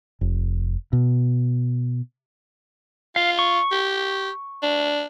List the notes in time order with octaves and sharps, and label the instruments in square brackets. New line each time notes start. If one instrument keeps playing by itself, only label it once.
[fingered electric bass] F1
B2
[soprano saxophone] F4 [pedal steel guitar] F5
[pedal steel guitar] C#6
[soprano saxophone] G4
D4